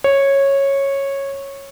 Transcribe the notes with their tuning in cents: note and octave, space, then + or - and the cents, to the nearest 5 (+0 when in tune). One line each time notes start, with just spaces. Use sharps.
C#5 -10